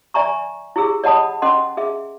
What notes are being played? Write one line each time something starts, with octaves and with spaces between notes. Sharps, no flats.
D5 E5 G#5 A#5 C#6
E4 G4 G#4 E6
C#5 D#5 F#5 A5 B5 D#6
C#4 A4 D#5 F#5 C6
G#4 E5